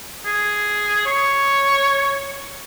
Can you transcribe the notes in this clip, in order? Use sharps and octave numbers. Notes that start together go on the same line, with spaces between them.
G#4
C#5